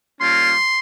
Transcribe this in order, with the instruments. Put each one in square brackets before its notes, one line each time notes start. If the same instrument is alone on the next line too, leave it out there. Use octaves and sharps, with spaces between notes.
[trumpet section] G3 A#3 C#4 F4 C6